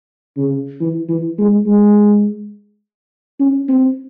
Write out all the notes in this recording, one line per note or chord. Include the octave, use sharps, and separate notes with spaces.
C#3
E3
E3
G#3
G#3
C#4
C4